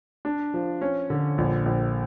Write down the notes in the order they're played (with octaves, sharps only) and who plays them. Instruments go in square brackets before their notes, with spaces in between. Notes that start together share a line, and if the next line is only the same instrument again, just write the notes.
[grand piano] D4
F3
C#4
D3
A#1
A#1